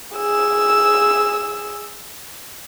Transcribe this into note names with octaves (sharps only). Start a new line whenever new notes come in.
G#4 E6